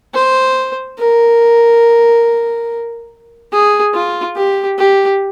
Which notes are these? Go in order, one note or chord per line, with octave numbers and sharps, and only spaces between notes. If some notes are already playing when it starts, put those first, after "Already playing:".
C5
A#4
G#4
F4
G4
G4